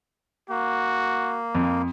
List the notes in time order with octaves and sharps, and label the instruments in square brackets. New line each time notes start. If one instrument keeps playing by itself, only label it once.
[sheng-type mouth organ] A#3 [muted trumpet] F#4
[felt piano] F2